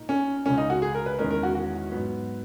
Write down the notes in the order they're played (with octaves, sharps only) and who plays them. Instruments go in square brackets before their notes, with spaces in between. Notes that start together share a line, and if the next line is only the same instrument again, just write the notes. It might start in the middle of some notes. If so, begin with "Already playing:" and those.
Already playing: [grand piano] A#2 A#3 D#4
[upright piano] C#4
[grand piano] C#2 C#3 G#3 [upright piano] C#4
[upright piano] D#4
F#4
G#4
A#4
B4
[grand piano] E2 D#3 G#3 C#4 [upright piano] A#4
[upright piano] A#4
F#4
F#4
[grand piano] G#2 F#3 B3